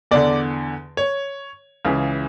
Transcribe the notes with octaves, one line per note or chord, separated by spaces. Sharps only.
E2 D3 D5
C#5
C#2 C#3 E3